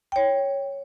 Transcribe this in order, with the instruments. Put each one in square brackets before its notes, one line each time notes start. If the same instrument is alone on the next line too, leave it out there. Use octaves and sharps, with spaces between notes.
[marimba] C#5 G5